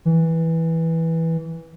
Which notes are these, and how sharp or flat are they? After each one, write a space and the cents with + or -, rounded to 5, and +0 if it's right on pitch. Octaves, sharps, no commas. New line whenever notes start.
E3 -10